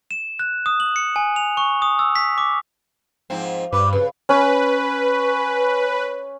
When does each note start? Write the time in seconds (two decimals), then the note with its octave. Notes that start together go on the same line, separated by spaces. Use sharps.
0.11 E7
0.39 F#6
0.66 D#6
0.80 F#7
0.96 C#7
1.16 G#5
1.36 F7
1.57 C#6
1.82 D#6
1.99 E6
2.16 B6
2.38 D6
3.30 G#2 F3 C4
3.73 G2 B4 D6
3.93 C#3 B4
4.29 C#4 B4